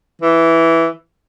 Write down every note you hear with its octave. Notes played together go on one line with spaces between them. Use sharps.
E3